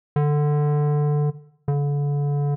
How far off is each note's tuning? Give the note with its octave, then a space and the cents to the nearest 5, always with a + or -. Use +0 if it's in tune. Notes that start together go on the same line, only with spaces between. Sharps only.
D3 +10
D3 -35